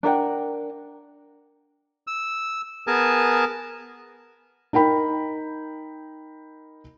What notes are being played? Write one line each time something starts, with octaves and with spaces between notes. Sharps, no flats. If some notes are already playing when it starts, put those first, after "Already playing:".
D4 A#4 F#5 G5
E6
B3 G#4 A#4 G#5 A5
D#4 A#4 G5 B5